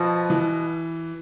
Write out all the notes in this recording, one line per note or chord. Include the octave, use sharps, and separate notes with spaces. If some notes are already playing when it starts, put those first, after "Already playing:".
Already playing: B2 F3
E3